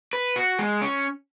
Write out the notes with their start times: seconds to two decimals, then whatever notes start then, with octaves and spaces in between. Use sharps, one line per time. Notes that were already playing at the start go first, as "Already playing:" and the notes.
0.13 B4
0.36 F#4
0.59 G#3
0.82 C#4